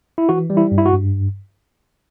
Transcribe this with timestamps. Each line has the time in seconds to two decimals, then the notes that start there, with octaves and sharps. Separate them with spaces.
0.18 E4
0.29 E3 F#4
0.50 G3
0.57 E4
0.71 G2
0.78 E4
0.86 F#4
0.93 G2